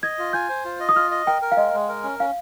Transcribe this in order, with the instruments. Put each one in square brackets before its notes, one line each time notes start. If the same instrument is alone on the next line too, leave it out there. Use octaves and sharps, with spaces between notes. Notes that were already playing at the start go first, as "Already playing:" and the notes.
[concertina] D#5 [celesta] G#6
[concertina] F4
[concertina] G#5 [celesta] G6
[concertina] C5
F4
D#5
[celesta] D#6
[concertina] F4 [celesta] F6
[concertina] D#5
[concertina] A#4 [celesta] G5
[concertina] A#4
[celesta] F5
[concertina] G#3 [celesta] D#5
[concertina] G#3
A#4
C#4
[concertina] C#4 [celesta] F5